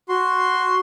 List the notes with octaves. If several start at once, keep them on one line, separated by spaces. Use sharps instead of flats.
F#4 C6